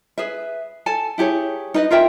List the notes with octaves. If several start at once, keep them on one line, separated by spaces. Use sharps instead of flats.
G#4 B4 E5
A4 G#5 A5
E4 G4 G#4 C#5
D#4 B4 D#5
F4 A#4 E5 G5